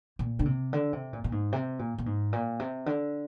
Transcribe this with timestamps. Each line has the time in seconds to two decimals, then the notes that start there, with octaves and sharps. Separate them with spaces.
0.19 A#2
0.39 D3
0.46 C3
0.73 D3
0.93 C3
1.13 A#2
1.24 A#2
1.32 G#2
1.53 C3
1.79 A#2
1.98 A#2
2.06 G#2
2.33 A#2
2.60 C3
2.86 D3